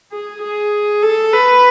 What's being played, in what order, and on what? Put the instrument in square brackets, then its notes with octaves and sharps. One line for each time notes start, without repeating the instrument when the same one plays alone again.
[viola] G#4
G#4
A4
B4